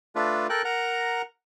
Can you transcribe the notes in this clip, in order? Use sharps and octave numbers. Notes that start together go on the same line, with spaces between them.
A3 D4 F4 B4
A4 A#4 G5 F#6
A#4 F#5 A#5